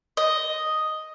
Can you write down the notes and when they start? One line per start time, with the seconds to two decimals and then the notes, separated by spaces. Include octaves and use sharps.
0.17 D#5